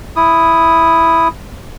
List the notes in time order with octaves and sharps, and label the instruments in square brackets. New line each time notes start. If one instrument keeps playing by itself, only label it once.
[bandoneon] E4 D#6